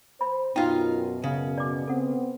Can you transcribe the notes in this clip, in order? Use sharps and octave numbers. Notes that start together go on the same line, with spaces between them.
C5 B5
F#2 B2 D#4 F4 F5 G5
C#3
D5 D6
B3 C4 A4 F#5